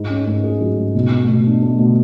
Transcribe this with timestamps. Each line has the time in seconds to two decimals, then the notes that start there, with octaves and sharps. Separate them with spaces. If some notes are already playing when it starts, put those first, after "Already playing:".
Already playing: G#2
0.10 C#4
0.27 G#2
0.44 G#4
0.61 F#3
0.78 G#2
0.95 B2
1.12 A3
1.29 B2
1.46 D4
1.62 A3
1.79 B2